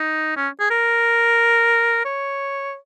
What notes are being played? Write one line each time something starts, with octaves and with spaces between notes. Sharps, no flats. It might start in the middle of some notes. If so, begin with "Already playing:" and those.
Already playing: D#4
C#4
G#4
A#4
C#5